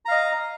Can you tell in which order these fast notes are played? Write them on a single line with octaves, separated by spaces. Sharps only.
A#5 F5 D#5